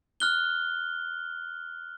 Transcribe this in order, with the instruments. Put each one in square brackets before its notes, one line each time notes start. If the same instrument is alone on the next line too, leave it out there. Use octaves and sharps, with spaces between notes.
[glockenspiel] F6 F#6 G7